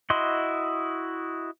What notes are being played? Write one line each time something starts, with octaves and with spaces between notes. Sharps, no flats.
E4 F#4 D#5 C6